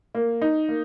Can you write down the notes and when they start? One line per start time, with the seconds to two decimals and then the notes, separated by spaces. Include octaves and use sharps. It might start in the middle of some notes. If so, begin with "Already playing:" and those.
0.15 A#3
0.42 D#4
0.69 A#3